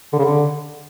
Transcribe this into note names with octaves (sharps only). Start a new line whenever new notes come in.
D3
C#3
D3